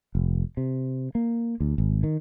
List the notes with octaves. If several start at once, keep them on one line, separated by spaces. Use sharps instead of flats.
F1
C3
A#3
D2
G#1
D#3